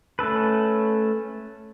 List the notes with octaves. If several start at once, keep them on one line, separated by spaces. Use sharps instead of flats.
A3 C#4 A4 B4